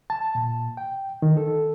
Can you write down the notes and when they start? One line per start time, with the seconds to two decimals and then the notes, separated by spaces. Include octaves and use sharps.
0.10 A5
0.35 A#2
0.77 G5
1.22 D#3
1.37 A4